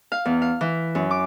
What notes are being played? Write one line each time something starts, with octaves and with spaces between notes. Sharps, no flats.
F5
E2
F5
E3
F#2
D6